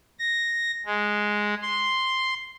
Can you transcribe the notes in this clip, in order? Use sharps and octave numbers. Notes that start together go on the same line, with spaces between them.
A#6
G#3
C6